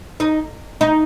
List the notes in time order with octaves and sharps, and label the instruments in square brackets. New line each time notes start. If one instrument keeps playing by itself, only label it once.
[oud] D#4
D#4